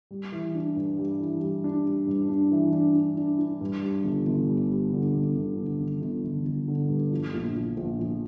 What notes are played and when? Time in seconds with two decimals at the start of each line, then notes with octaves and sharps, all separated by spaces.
0.11 G3
0.32 E3
0.55 D4
0.76 G2
0.98 G3
1.20 E3
1.41 G3
1.64 D4
1.85 G3
2.07 G2
2.29 D4
2.51 E3
2.73 D4
2.95 D4
3.17 D4
3.39 D4
3.61 G2
3.82 G3
4.04 G1
4.27 G1
4.48 G3
4.71 G3
4.93 D3
5.14 G1
5.36 G1
5.57 D3
5.80 G1
6.01 G1
6.24 G1
6.45 G1
6.68 D3
6.89 G2
7.11 F3
7.34 A#1
7.55 F3
7.77 A#1
7.99 F3